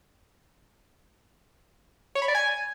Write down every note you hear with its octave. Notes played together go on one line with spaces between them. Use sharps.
C#5
B5
D5
G#5